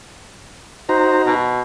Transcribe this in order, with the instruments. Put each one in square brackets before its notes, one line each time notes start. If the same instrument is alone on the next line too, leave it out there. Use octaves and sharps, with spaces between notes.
[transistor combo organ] D#4 F#4 A#5 [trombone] C5
[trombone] B2